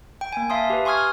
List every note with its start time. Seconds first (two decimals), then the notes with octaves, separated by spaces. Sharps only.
0.21 G5
0.32 A#3 G5 G#5
0.50 E5 F5 A5 C6 D#6
0.70 G4 B4
0.85 G#5 C6 C#6 D#6 F6 G#6
0.97 F6